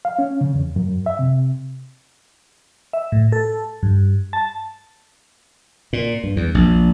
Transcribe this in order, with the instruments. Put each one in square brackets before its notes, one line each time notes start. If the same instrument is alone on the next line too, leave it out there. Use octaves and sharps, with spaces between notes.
[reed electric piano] F5
C#4
C#3
E2
F#2
E5
C3
[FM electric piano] E5
A2
A4
G2
A5
[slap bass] A#2
G2
E2
A#1